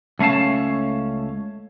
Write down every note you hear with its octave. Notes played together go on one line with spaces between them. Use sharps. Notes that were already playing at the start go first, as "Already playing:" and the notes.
C#2 A3 C#4 F5 A5